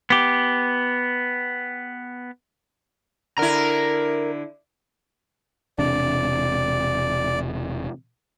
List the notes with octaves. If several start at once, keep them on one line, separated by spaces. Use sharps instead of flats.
B3 G4
D3 E4 A#4 A#5
E1 C3 D4 D5